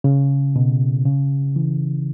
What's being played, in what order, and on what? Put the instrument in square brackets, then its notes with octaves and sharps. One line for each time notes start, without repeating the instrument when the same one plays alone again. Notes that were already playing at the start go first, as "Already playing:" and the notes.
[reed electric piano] C#3
B2
C#3
E3